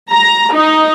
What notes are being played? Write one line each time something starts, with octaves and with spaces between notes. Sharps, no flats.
A#5
D#4